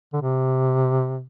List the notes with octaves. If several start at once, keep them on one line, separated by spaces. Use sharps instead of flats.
D3
C3